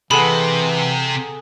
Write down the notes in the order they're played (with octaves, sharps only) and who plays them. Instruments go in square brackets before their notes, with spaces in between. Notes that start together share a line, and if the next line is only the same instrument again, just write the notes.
[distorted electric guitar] C3 [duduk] E3 [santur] G#4 A4 F#5 [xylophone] B5